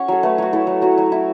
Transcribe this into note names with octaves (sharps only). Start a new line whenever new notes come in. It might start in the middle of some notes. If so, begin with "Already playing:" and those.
Already playing: C#4 F#4 C#5 F#5
F#3 A4
A3 B4
F#3 F#4
E4 A4
F#3
F#3 F#4
F#3
E4